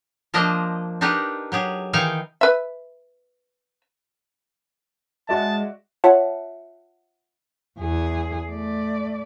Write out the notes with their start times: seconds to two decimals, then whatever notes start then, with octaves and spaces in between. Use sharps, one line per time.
0.34 F3 A#3 D4 A#4 C5 D#5
1.01 D4 D#4 G4 A#4 B4
1.52 F#3 G4 G#4
1.93 D#3 E3 D#4 F5 G5 G#5
2.41 B4 E5
5.29 G#3 F#4 D5 E5 A5
6.04 F4 C#5 E5 F#5 A5
7.80 E2 G#4
8.49 A3 D5